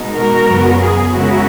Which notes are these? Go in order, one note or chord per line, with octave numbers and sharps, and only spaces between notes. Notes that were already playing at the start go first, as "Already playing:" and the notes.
Already playing: B2 G#3 D#4
F#4 A#4
F#2 C#3 F#3 B3
G#4
C#3 G#3 C#4 E4 F#4 A#4